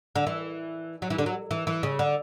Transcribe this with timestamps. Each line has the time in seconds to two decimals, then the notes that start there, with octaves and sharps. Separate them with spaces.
0.15 D3
0.26 E3
1.02 F#3
1.10 E3
1.18 D3
1.26 F#3
1.51 E3
1.67 E3
1.83 C#3
1.99 D3